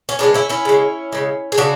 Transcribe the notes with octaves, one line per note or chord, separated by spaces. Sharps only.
C#4
C#3 G#3 B3 D4
C#4 E4
C#4 E4
C#3 G#3
C#3 G#3
G#4
C#3 D4 F#4